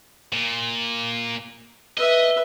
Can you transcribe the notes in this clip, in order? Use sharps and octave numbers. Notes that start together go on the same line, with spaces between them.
A#2
B4 D#5 E5